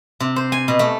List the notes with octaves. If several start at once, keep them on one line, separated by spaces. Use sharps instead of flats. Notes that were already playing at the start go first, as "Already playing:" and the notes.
C3
C5
G#5
B2
A3